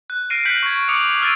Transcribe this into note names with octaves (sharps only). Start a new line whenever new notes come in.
F#6
F6 A#6 C7 D7 D#7
F#6 G6 B6 C#7 F#7
C#6 G#6
D6 D#6 C#7 F7
E6 F6 G#6 A6 D7 D#7